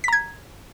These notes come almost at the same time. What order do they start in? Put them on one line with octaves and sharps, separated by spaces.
B6 A#5 G#6